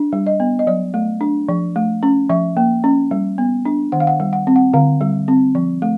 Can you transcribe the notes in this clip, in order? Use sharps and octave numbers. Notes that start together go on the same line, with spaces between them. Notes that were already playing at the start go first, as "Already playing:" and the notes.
Already playing: D4
G3
D#5
B3
D#5
F#3 D5
A3
D4
F3
A3
C#4
F3 E5
A#3
C#4
G3
B3
D4
D#3 F#5
F5
F#5
G3
F#5
C4
F#5
D3 F5
G3
C4
F3
A3